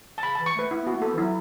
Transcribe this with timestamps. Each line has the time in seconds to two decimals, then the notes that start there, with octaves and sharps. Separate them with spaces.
0.18 A5
0.23 C#3 B5
0.35 A5
0.39 E3
0.46 C#6
0.55 A3 B4
0.71 E4
0.82 B3 F#4
0.93 A3 F#4
1.02 B3 A4
1.14 E3
1.18 F#3 E4